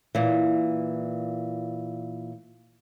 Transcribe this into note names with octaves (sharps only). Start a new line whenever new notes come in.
A#2 E3